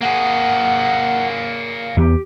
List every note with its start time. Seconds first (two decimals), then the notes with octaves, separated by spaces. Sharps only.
0.02 A#3 G#4 F#5
1.97 E2 B3 G4